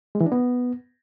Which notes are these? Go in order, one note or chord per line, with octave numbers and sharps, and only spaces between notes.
G#3
E3
D4
B3